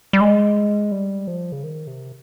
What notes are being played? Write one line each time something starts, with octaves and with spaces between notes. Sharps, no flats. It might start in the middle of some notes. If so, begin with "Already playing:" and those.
G3
G#3
G3
F3
C#3
D#3
C3